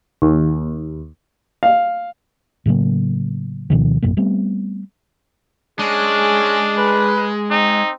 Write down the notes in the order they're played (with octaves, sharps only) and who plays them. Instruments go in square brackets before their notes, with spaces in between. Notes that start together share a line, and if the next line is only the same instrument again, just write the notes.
[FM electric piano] D#2
[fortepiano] F5
[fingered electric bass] A2 C#3 F#3 A#3
D2 B2 D#3 F3
A1 F#2 B2 A#3
G3 A3 B3 C4
[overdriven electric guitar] G#3 [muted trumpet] C#4 [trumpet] D4 [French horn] G#4
[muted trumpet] B4
[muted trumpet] C4 [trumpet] D#4